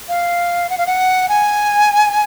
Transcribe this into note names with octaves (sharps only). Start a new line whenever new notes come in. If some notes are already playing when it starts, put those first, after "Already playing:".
F5
F#5
F5
F#5
G#5